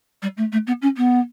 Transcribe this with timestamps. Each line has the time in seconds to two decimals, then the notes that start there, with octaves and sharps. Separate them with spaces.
0.22 G3
0.37 A3
0.52 A3
0.67 B3
0.82 C#4
0.97 B3